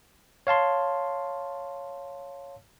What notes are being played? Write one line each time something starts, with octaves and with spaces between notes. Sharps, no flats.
C#5 F5 A5 C6